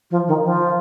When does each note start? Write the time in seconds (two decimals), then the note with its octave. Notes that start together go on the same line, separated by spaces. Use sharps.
0.10 F3
0.27 D#3
0.43 F3